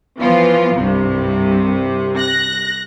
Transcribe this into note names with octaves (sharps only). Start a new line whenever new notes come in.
E3 F3 B3 F4
C2 G2 C3
F#6 A#6